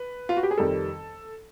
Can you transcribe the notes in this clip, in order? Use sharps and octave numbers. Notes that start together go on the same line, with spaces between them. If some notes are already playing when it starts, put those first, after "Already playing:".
Already playing: B4
F4
F#4
G4
G#4
F2 C3 D#3 G3 A4